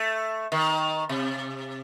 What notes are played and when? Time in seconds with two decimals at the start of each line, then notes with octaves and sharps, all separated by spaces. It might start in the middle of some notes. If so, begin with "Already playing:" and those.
Already playing: A3
0.52 D#3
1.09 C3